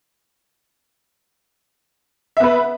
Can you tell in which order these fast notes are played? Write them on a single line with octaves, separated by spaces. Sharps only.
E5 B3 B4